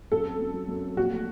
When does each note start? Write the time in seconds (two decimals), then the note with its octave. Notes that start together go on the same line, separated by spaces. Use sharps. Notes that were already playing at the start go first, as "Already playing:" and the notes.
0.12 F#2 A4
0.26 C4
0.40 F#2
0.54 F#3
0.69 F#2
0.84 C4
0.97 A#1 F#4
1.12 A3